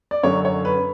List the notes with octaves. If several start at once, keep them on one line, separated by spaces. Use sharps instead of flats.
D5
F#2 D3 F#3 C#5
C#5
B4